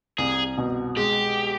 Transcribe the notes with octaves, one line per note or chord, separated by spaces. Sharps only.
C2 G#4
B2
G#3 G4